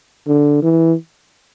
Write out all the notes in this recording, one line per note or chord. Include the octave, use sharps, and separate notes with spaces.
D3
E3